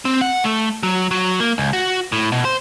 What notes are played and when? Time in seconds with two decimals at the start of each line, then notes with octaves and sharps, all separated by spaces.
0.05 C4
0.21 F#5
0.44 A3
0.83 F#3
1.11 F#3
1.40 A#3
1.58 C#2
1.73 F#4
2.12 A2
2.32 B2
2.45 C5